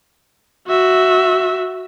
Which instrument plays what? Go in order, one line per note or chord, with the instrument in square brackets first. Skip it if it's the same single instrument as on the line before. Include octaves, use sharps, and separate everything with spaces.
[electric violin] F#4 E5